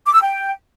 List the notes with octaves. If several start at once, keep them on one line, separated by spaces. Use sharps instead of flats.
D6
E6
G5